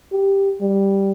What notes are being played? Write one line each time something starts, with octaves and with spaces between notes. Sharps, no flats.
G4
G3